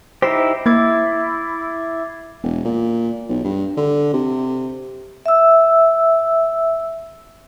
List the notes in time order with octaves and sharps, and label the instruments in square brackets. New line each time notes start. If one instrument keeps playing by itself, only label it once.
[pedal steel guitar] D#4 E4 G4 [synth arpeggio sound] C5 [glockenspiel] A#6 C7
[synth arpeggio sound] A#3 [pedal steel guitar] E4 [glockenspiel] D6 G#6 A6
[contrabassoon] E1
A#2
B1
G2
D3
C3
[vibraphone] E5 E6